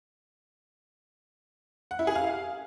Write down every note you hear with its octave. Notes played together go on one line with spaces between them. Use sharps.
F#5
E4
G#4
F5